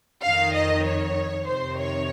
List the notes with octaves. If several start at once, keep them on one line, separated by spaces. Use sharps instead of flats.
F2 D#3 F5
D#5
C#5
F2 C3 D#3 C5
C#5